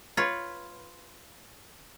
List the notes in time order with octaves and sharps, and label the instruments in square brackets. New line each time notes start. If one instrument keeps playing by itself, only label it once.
[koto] F4 B4 C#5